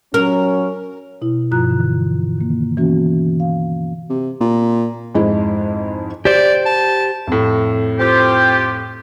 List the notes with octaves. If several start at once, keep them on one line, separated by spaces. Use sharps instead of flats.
F#3 C#4 A#4
B2 E4
G2 B2 F3 F4 A#5 F#6
D3 E3
D#3 A#3
E3 A#3 B3 C#4 F#4
F5
C3
A#2
F2 G#2 G#3 E4
G4 C5 D5
A5
F2 A2
C4 F4 G4